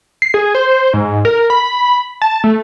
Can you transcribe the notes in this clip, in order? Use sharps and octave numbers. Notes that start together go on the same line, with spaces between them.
C7
G#4
C5
G#2
A#4
B5
A5
A3